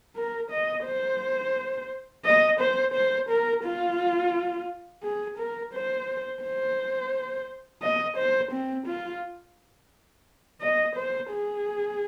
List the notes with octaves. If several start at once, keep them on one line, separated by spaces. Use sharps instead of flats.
A#4
D#5
C5
D#5
C5
C5
A#4
F4
G#4
A#4
C5
C5
D#5
C5
C4
F4
D#5
C5
G#4